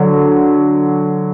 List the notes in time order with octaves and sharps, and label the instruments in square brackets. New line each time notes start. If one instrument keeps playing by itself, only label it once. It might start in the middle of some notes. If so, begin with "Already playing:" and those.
Already playing: [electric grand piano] D3 F#3